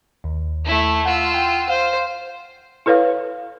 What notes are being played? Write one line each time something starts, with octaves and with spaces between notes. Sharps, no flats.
D#2
A3 E4
F4 F#5 E6 F#6
G5 D#7
C5 F5
E4 A4 B4 C#5 F5